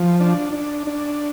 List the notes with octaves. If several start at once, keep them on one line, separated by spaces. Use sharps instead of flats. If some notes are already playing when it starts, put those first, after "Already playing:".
Already playing: F3
D4
D4
D4